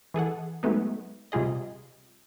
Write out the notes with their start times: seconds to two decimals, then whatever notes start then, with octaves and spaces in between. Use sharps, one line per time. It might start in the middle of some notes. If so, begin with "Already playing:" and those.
0.14 E3 G#4 A4 F#5
0.63 F#3 G#3 A3 B3 D#4
1.32 C3 G3 F4 G#4 D#5